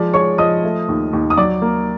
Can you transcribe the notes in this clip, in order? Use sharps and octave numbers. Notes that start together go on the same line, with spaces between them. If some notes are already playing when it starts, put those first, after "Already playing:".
Already playing: F3 G#3 D5
G#3 C#5 C#6
F3 D#5 D#6
A3
D#2
D#2
D#6
F#3 D5 D6
A#3